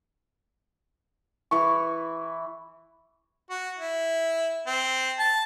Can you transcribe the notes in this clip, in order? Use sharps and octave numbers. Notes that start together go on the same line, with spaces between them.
E3 E4 C#6
F#4
E4
C4
A5